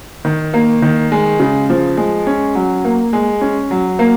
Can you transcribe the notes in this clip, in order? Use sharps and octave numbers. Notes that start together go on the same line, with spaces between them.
D#3
A#3
D#3
G#3
C#3
F3
G#3
C#4
F#3
A#3
G#3
C#4
F#3
A#3